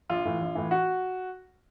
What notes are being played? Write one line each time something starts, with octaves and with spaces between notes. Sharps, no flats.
A#1 F4
A2 E3
A#1
A2 E3
F#4